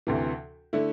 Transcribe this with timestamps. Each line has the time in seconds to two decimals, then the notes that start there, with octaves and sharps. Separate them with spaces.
0.07 D2 C3 E3
0.73 D3 A3 E4